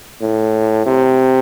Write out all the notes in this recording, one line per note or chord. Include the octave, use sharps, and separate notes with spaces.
A2
C3